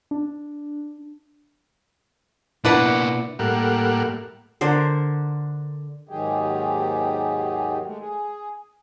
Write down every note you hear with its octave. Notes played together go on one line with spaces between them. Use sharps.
D4
B2 A#3 D4 E4 B4 F#5
A2 G3 A#3 F#5
D3 A#4 C5
D#2 G#2 D#3 F#3 G4 G#4
G#3 A3
G#4